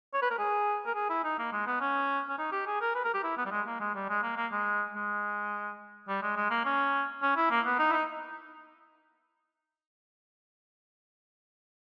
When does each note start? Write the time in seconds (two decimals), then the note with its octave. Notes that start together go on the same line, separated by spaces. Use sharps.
0.14 C#5
0.22 B4
0.30 A#4
0.38 G#4
0.86 A#4
0.95 G#4
1.09 E4
1.24 D#4
1.39 A#3
1.52 G#3
1.66 B3
1.81 C#4
2.29 C#4
2.38 D#4
2.52 G4
2.66 G#4
2.81 A#4
2.95 B4
3.05 A#4
3.14 G4
3.23 E4
3.37 B3
3.45 G3
3.51 G#3
3.66 A#3
3.80 G#3
3.95 G3
4.09 G#3
4.23 A#3
4.36 A#3
4.52 G#3
4.95 G#3
6.08 G3
6.22 G#3
6.36 G#3
6.50 A#3
6.65 C#4
7.22 C#4
7.36 E4
7.50 A#3
7.65 B3
7.79 D#4
7.90 E4
7.93 D#4